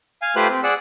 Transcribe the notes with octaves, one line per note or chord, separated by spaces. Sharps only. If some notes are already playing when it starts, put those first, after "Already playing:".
F5 G#5
A3 F4 G4 B4 C5 F#6
C4
G#4 D5 F#5 E6